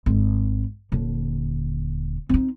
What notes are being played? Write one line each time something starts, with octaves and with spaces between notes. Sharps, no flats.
G#1
D#1 D3
C4 D#4